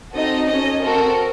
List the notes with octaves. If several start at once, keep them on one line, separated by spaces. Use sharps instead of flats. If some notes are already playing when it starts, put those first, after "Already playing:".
C4 D#4 F#4 A4 D#5
C#4 A4 D#5
C4 F#4 A4 A#4